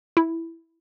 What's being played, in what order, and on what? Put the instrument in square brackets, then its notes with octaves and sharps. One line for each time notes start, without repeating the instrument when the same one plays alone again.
[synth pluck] E4